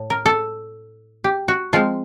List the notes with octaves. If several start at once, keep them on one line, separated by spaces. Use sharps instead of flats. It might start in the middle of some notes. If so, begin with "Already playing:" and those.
Already playing: A2
A#4
A4
G4
F#4
F3 G#3 C4 F4